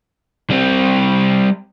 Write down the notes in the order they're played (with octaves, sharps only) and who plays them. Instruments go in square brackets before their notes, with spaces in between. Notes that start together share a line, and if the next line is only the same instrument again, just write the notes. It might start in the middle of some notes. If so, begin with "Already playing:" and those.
[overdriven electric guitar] G3 C4